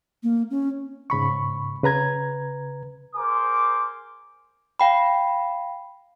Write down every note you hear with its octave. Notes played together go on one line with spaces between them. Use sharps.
A#3
C#4
G#2 C#3 B5 C#6
C#3 B4 A#5 G#6
G#4 A#4 C5 D6
F5 G5 B5